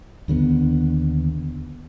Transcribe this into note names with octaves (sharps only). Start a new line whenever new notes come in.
D#2 D3 F3 B3